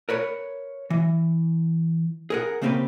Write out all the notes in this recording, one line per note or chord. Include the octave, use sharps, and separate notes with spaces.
A#4 B4 C#5
E3
G#4 A#4 F#5
C#3 A#3 C4 C#4 G4 B4